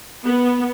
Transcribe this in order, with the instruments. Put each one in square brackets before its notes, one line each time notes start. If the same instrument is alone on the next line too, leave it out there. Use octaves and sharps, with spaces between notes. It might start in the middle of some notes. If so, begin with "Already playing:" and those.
[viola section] B3